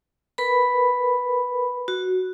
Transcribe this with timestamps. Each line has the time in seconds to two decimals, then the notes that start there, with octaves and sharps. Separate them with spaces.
0.38 A#4 B4 B5
1.88 F#4